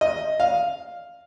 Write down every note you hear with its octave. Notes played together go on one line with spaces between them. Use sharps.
D#5
F5